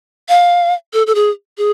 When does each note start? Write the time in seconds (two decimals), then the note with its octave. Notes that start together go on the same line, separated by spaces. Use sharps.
0.29 F5
0.93 A4
1.07 A4
1.15 G#4
1.58 G#4